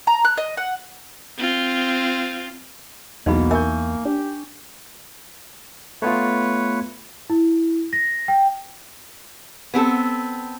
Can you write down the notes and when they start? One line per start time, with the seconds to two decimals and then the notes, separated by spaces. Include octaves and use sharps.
0.07 A#5
0.25 F#6
0.38 D#5
0.57 F#5
1.38 C4 F4
3.26 B1 E2 B2 A#3 B3 D#4 B5
3.51 A#4 E5 G#5 C#6 E6 G6
4.05 D4 G4
6.02 A3 B3 F4 B4 C#5
7.30 E4
7.93 A#6
8.28 G5
9.74 B3 C4 G#4 A4